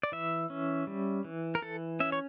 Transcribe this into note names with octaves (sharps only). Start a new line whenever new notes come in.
D5
E3 E5
C#4
G3
E3
A#4
E3 A4
C#4 E5
C#5